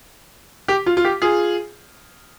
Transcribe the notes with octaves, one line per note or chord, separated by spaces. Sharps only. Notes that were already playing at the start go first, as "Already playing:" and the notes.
G4
F4
F4
G4
F4 G#4